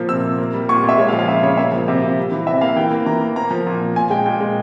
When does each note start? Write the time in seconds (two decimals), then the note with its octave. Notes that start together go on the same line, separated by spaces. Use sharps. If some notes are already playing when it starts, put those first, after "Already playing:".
Already playing: A#2 F3 A#3
0.09 C3 E6
0.24 C3
0.38 A#3
0.54 G3
0.69 A#2 C#6
0.83 A#2
0.89 E5
0.98 G#3 C#5
1.08 F5
1.13 F3
1.19 F5
1.28 C#3 E5
1.42 C#3 C#5
1.57 A#3 E5
1.72 F3
1.88 C3 E5
2.02 C3
2.17 G3
2.32 E3
2.47 C3 E5
2.61 A#3 F5
2.76 E3 G5
2.92 A#3
3.06 E3 A#5
3.21 A#3
3.36 A#3 A#5
3.51 F3
3.67 A#2
3.81 A#2
3.96 A#2 G#5
4.10 G#3 G5
4.26 A#2 G5
4.40 G#3